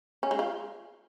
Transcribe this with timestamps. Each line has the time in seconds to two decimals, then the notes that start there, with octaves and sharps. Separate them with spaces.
0.23 C#4
0.31 G#3
0.39 F4